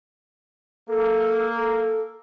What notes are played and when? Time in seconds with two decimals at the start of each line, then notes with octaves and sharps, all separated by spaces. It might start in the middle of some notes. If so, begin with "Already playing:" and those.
0.89 A#3 A4
1.57 A4